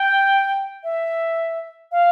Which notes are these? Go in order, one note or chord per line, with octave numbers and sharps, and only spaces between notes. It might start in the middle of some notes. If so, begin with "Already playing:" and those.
Already playing: G5
E5
F5